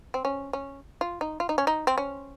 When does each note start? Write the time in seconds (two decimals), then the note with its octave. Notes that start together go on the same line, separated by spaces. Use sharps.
0.14 C4
0.25 C#4
0.53 C#4
1.01 F4
1.21 D#4
1.40 F4
1.49 D#4
1.58 C#4
1.67 D#4
1.87 C4
1.98 C#4